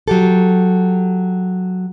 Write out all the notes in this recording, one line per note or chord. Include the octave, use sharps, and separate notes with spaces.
F#3 G4 A4